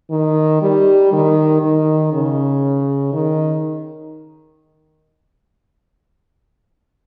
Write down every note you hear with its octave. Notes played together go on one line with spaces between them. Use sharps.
D#3
G3
D#3
D#3
C#3
D#3